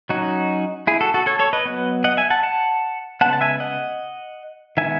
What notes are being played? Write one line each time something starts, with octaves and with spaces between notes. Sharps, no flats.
F#3 C#4 D#4 F#4
E4 G#4
F#4 A4
F#4 A4
A4 C#5
A4 C#5
B4 D#5
F#3 B3
D#5 F#5
E5 G#5
F#5 A5
F#5 A5
C#3 G#3 B3 F#5 A5
A5
E5 G#5
D#5 F#5
D#3 G#3 B3 E5 G#5